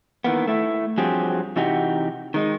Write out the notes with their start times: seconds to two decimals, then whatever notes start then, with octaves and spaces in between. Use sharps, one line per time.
0.24 D#3 E3 A#3 B3
0.47 A3 E4
0.98 G2 F3 F#3 C4 G4 G#4
1.56 C3 E3 D#4 F#4 G4
2.34 D#3 G#3 D#4